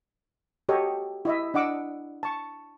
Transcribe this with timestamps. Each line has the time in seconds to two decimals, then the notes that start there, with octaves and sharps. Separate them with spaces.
0.69 F#4 G4 A4 C#5 D#5
1.25 E4 D#5 E5
1.54 D4 D#5 F#5 D6 E6
2.23 A5 C#6